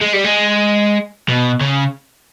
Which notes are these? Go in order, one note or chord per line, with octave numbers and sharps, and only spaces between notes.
G#3
G3
G#3
B2
C#3